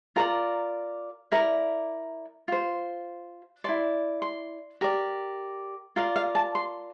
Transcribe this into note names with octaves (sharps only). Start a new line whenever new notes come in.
F4 A#4 D5 A#5
E4 A#4 D5 A#5
F4 C5
E4 A4 D5 C6
C6
G4 A#4 D5
F4 A#4 D5 F5
F5
A5
C6